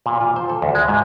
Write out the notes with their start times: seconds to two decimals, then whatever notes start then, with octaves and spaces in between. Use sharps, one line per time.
0.06 A#2
0.21 F4
0.36 C5
0.49 A4
0.62 D2
0.75 G#3
0.88 G#2